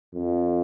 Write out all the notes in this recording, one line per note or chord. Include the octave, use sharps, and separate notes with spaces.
F2